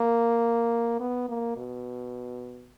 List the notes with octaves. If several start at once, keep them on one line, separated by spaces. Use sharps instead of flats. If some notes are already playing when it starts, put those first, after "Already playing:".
Already playing: A#3
B3
A#3
B2